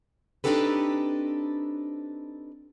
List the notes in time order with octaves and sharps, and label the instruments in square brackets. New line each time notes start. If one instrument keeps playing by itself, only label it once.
[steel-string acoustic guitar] C4 D4 D#4 G4 A4 B4